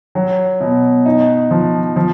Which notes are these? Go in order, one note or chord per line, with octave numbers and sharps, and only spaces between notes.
F#3
B2
D#4
F3
F3